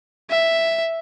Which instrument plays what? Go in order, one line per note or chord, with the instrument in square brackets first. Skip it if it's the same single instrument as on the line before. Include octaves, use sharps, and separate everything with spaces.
[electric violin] E5